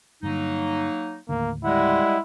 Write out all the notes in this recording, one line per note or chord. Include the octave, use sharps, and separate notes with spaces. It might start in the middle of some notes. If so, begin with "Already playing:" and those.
G2 D3 F#3 A#3 D#4
D#2 A2 D3 A#3
G3 G#3 E4 F#5